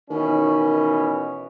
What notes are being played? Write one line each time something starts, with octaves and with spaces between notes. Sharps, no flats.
B2 D#3 E3 C#4